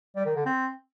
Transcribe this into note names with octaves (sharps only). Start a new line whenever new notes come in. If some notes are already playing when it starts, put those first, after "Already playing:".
G3
D#3
D3
C4